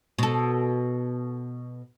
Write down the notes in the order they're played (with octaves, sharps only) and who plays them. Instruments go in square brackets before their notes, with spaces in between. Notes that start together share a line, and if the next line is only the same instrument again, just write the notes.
[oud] B2 A4